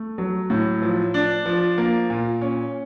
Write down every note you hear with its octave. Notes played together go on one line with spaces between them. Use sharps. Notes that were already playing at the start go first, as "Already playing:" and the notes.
Already playing: A3
F#3
A2
F3
D4
F3
A#3
A#2
C#4